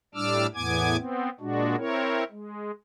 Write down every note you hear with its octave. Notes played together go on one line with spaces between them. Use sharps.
A2 G3 D4 D6 E6 F6
E2 A2 B3 G#5 D6 G#6
B3 C4
A#2 G#3 D4 F#4
C4 E4 A#4 C#5
G#3